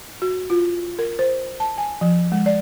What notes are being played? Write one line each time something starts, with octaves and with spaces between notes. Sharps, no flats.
F#4
F4
A#4
C5
A5
G#5
F3
G#3
D5